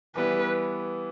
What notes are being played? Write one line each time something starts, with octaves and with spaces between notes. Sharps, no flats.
E3 G3 B3 E4 B4